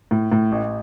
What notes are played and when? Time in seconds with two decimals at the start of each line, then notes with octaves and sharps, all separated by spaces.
0.11 A2
0.32 A2
0.52 A1